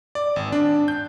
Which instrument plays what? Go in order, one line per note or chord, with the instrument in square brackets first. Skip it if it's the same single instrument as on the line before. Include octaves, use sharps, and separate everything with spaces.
[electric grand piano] D5
G#1
D4
G6